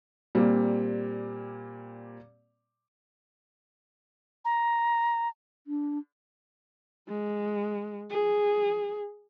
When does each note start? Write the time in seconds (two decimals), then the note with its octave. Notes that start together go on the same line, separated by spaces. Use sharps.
0.35 A#2 G3 A#3 C4
4.45 A#5
5.67 D4
7.08 G#3
8.10 G#4